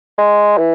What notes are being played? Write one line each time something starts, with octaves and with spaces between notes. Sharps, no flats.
G#3
E3